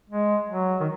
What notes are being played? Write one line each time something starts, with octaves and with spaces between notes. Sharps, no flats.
G#3
F#3
D#3